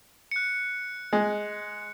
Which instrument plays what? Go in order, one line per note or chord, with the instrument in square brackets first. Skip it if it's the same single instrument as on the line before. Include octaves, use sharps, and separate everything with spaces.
[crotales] F#6 C#7
[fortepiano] G#3